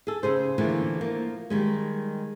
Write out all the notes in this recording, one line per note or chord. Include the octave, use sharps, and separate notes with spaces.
G#4 A4
C#3 G#4 C5
D3 E3 F3 A3 A#3 D4
F3 A#3
D#3 G3 G#3